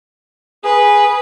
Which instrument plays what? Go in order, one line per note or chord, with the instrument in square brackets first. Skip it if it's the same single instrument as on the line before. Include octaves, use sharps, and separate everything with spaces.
[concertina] G#4 [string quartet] B4